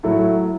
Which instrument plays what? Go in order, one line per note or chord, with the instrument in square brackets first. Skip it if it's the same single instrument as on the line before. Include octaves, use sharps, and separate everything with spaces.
[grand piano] A2 F#3 A3 E4